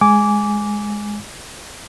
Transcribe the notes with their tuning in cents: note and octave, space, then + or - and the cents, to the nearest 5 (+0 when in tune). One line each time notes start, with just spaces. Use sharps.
G#3 +0 G#5 +0 D6 -15